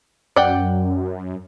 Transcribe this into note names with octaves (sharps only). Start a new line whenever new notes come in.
F#2 D5 F#5 G5